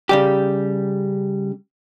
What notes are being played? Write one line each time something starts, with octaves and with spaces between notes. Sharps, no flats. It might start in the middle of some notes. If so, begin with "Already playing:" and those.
C#3 G3 G4